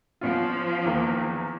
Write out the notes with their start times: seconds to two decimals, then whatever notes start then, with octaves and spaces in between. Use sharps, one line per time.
0.21 F3 B3 C#4 F4
0.85 E2 D#3 A#3